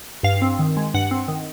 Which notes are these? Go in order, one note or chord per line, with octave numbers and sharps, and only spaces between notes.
G2 F5
C4
D#3
G#3
G2 F#5
C4
D#3